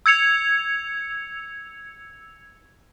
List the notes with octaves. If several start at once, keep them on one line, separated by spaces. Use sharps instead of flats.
E6 G#6 C#7 F7